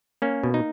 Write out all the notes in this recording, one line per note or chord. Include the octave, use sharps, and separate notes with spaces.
A#3 C#4
B2
D#4